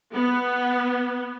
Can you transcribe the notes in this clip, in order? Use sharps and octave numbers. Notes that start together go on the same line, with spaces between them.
B3